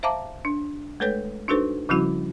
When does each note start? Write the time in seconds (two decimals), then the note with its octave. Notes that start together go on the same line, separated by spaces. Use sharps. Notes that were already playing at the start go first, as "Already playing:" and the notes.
0.03 C5 E5 F5 A5 A#5 D6
0.45 D4
1.00 G#3 A3 A4 B4 C#5 G6
1.48 D4 D#4 F#4 A4 B4 C5
1.89 C#3 F3 G3 C#4 E4 F#4